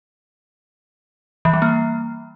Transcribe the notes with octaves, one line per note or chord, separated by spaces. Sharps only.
E3
G3
A#3